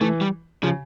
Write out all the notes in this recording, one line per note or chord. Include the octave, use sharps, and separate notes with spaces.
E3 A3
G3
C#3 F3